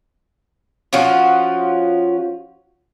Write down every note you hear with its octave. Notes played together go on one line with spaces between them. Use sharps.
F3 C#4 F4 F#4